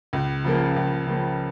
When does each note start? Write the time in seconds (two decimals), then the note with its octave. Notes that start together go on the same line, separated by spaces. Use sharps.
0.13 C#2
0.44 C#3 F3 A#3
0.76 C#2
1.07 C#3 F3 A#3